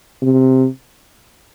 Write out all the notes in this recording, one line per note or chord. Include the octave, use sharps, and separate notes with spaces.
C3